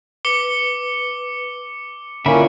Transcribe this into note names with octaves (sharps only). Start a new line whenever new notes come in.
B4 D6 C#7 G7
D3 A#3 C#4 E4 F4 E5 B5